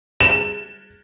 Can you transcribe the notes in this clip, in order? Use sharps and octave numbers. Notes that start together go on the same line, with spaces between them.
E7